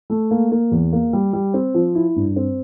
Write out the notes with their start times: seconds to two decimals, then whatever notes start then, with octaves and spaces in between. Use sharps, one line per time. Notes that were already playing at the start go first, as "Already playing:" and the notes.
0.10 A3
0.31 A#3
0.51 A#3
0.71 E2
0.93 A#3
1.13 G3
1.33 G3
1.54 C4
1.74 F3
1.95 E4
2.16 G2
2.36 C4